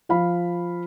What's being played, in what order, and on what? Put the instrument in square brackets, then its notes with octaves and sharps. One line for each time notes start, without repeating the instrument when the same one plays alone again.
[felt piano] F3 F5 B5